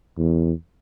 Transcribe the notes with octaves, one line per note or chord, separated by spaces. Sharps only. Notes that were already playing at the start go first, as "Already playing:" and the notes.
E2